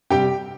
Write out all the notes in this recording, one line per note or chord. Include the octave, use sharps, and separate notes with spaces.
C3 G3 G4 G5